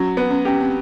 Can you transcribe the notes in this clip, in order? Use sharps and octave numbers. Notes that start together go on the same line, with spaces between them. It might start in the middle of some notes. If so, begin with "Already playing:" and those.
Already playing: F#3 C#4
B3
C#4
C#4 G4
C4